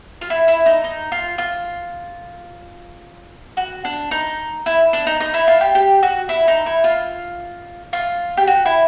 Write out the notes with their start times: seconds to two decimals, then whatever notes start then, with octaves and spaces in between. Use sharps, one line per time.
0.21 F4
0.30 E4
0.48 E4
0.66 D#4
0.84 D#4
1.12 F4
1.38 F4
3.57 F#4
3.85 D4
4.11 D#4
4.66 E4
4.93 D4
5.07 D#4
5.20 D#4
5.34 E4
5.48 F4
5.61 G4
5.75 G4
6.03 F#4
6.29 E4
6.48 D#4
6.66 E4
6.84 F4
7.93 F4
8.37 G4
8.47 F#4
8.65 E4